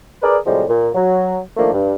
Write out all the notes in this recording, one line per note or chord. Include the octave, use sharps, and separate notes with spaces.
G#4 A#4 B4 D5
A2 C3 F3 G3 G#3
A#2
F#3
D#3 F3 A3 A#3 D4
G2